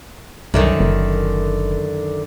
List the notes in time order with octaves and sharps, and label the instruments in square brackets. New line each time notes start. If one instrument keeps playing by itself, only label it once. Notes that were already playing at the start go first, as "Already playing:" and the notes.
[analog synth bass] C2 [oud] F#2 D3 D#3
[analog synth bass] F#1